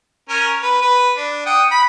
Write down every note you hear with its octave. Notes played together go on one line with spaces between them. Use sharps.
C#4 A#4
B4
B4
D4
F#5 G5 D#6
B5